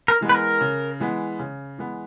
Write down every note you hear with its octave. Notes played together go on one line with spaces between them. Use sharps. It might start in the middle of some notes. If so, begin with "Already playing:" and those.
A#4
E3 G#3 B3
B4
A#4
C#3
E3 G#3 B3
C#3
E3 G#3 B3